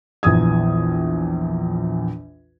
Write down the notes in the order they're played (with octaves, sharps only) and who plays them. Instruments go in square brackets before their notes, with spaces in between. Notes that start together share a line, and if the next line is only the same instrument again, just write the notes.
[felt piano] A#1 E2 D#6 G#6